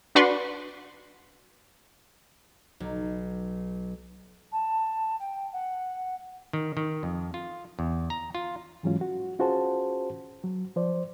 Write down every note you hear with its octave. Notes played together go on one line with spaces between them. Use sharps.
D4 F#4 B4 D5 C6 C#6
B1
A5
G5
F#5
D#3
D#3
F2
F4
E2
A#5
F4
G#2 E3 F#3 G#3 C#4 F4
F#4
C#4 F4 F#4 G#4 C5 A5
F#3
F3 C5 D5